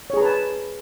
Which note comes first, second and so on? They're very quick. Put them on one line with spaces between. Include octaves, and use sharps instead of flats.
C#5 G#4 A#5 B4 A5